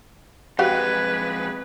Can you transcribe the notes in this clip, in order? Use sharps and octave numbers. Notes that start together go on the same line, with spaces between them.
F2 G#3 F#4 G4 B4 F5